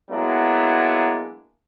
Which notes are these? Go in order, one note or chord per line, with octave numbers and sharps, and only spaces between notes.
F#3 G#3 A#3 B3 D4 E4